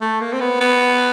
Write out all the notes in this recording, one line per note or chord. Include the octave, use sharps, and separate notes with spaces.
A3
A#3
C4
B3
B3